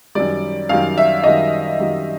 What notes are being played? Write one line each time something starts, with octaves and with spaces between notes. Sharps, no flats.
F#2 D#3 G3 D5
F#2 D#3 G3 F5
E5
F#2 D#3 G3 D#5
F#2 D#3 G3